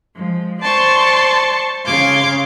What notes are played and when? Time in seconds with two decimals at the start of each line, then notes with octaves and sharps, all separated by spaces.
0.15 F3 G#3
0.60 C5 D5 A5 C6 C#6
1.86 C#3 F5 C6 D6 G#6